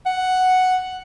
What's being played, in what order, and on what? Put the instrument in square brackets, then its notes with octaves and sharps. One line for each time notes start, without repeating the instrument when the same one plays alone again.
[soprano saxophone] F#5